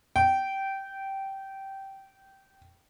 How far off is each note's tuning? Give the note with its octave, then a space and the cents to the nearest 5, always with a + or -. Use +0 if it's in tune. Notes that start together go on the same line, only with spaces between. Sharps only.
G5 -15